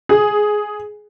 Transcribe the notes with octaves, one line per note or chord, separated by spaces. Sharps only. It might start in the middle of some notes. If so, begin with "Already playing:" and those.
G#4